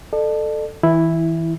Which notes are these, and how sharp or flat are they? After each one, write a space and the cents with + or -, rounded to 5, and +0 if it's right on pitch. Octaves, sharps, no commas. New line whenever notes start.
A4 +0 D5 +45
E3 -20 E4 +0